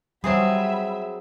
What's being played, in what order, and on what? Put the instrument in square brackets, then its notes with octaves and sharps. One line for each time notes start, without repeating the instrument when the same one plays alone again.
[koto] F#3 C4 G#4 [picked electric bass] G3 [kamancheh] E5 B5